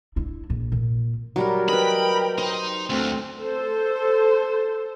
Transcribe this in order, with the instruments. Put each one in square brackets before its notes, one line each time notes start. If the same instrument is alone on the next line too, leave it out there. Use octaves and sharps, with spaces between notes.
[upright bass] D4 E4
A#1
A#2
[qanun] F#3 G3 A#4
[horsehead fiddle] A#4 G5 [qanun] B4 D#5 [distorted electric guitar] B5
[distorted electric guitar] D#4 [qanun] C5
[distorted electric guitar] D2 [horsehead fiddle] A3 C4
[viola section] A4 C5